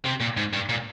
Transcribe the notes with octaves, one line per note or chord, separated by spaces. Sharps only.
C3
A#2
G#2
G2
A#2